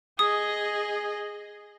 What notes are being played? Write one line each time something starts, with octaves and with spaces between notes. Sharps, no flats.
G#4 D#5 D#6